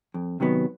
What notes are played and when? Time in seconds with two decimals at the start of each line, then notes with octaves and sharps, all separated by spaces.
0.14 F2
0.40 C3 D#3 F#3 B3